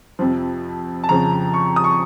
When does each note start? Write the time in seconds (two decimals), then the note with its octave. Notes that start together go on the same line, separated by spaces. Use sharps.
0.19 F2 C3 F3
1.04 A5
1.09 F2 C#3 F3 A#5
1.54 C#6
1.76 D#6
1.84 C#6